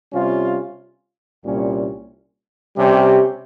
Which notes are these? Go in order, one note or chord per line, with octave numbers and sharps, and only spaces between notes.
C3 G3 C#4 F4
C2 A#2 G3 C#4
C3 G3 C#4 G4